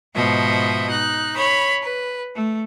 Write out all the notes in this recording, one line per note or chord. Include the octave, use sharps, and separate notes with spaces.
G#2 B2 F3 D#5 E5
D#4 F#6
C#5 B5
B4
A3